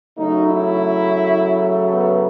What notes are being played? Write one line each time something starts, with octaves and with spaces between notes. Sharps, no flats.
C#3 F#3 A3 D#4
E4
B3